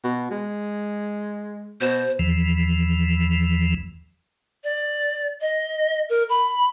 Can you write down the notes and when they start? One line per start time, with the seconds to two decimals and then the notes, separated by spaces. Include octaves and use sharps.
0.04 B2
0.31 G#3
1.81 B2 C5
2.19 E2 E3 F3
4.64 D5
5.41 D#5
6.09 A#4
6.29 B5